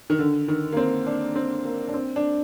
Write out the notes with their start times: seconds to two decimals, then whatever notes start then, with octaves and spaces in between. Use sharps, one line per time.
0.10 D#3
0.19 D3
0.48 D#3
0.72 A#3
0.77 C4
1.06 D4
1.36 C4
1.65 A#3
1.88 D4
1.94 C4
2.16 D4